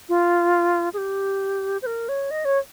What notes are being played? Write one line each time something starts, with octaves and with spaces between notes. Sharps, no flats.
F4
G#4
G4
C5
A#4
C#5
D#5
C#5